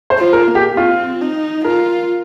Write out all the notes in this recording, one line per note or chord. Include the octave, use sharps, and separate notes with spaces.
C5
F4
A#4
A#3
G4
C4 F4
D#4
F4 A#4